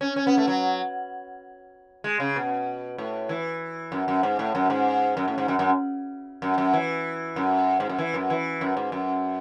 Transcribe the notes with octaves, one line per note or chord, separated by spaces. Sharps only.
C#4
C#4
B3
A3
F#3
G#3
C#3
B2
A2
E3
F#2
F#2
G#2
A2
F#2
G#2
F#2
A2
G#2
F#2
F#2
F#2
F#2
E3
F#2
G#2
F#2
E3
F#2
E3
F#2
G#2
F#2